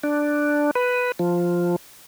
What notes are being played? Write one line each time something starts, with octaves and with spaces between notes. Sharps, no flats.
D4
B4
F3